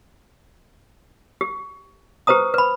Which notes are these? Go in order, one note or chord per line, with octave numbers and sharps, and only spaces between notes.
G4
G4 B4 C5 A#5 D#6
B4 B5